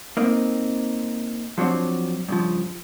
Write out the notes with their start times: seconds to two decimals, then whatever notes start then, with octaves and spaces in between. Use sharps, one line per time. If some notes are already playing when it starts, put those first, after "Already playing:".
0.17 A#3 C4 D#4
1.58 F3 F#3 C4 D4
2.29 G2 C#3 F3